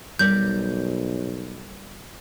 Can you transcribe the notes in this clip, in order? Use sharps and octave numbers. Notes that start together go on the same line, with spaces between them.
B1 G3 A#4 D5 G6